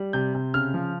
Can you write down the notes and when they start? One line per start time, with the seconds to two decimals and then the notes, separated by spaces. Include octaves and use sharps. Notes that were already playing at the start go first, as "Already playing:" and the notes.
Already playing: G3
0.13 C3 G6
0.35 C3
0.54 C#3 F6
0.74 F3